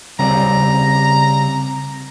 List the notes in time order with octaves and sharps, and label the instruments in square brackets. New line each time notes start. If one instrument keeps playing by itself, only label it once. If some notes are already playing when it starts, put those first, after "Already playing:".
[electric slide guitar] C#3 G3 C4 [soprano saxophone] A#5